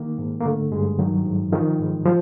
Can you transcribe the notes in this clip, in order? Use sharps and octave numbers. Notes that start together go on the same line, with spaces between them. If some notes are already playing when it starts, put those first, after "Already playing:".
Already playing: D#3 A#3
G#2
A#3
D3 A3
G2 G#3
D#3 F#3
G#2
D#3 F3
G#2
F3